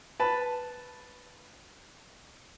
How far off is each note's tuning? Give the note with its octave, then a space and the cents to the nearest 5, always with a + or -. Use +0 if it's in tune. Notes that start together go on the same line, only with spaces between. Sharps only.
B4 +0 A5 +0